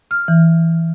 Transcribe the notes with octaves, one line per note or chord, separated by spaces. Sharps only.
F6
E3